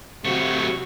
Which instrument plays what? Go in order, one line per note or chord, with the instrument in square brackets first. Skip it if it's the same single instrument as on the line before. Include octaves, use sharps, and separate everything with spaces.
[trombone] C3 [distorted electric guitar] F#3 A3 [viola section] F#4 [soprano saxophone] C#6